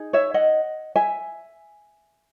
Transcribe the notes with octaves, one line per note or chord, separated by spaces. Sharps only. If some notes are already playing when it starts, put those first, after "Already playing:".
Already playing: D#4 G#4
C#5 E5
D#5 F#5
E5 G#5